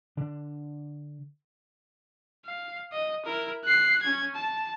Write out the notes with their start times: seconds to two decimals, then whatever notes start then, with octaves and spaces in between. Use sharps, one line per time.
0.17 D3 D4
2.46 F5
2.92 D#5
3.25 E4 A#4
3.65 F#6 C7
4.03 C#4 G#6
4.35 A5